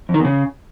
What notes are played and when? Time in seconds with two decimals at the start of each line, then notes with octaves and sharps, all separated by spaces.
0.09 F2
0.14 D#3
0.19 E2
0.25 C#3